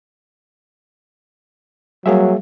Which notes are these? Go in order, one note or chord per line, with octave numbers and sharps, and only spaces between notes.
F#3 G3 A#3 G#4 E5 F5